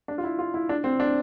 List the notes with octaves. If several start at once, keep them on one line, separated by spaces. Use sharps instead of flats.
D4
F4
E4
F4
E4
D4
C4
D4